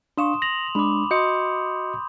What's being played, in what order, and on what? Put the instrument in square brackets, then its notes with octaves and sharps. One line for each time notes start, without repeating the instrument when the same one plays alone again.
[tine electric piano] D4 F5 C#6 [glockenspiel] C6 D#6 E7
[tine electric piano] A#6 [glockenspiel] F7 F#7
[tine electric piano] G#3 D4 [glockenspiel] B5 D6
[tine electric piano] F#4 D#5 C#7 [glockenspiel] C6 D#6 G6